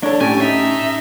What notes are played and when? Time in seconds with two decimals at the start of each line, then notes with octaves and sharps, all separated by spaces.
0.03 D4 A4 C#5
0.21 A2 C#4 G4 G#5 A5
0.41 D#4 E5